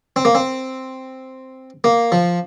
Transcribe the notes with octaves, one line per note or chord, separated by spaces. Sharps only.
C4
A#3
C4
A#3
F3